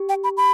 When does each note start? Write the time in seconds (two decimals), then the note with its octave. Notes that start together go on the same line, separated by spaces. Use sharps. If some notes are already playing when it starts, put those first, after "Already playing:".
Already playing: G4
0.09 G5
0.24 B5
0.37 B5